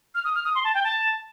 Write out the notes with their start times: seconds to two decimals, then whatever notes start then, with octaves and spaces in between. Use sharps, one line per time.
0.15 F6
0.25 D#6
0.35 F6
0.45 D#6
0.55 C6
0.64 A5
0.74 G5
0.84 A5